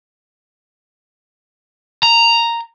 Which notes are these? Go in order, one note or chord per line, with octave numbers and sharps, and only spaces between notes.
A#5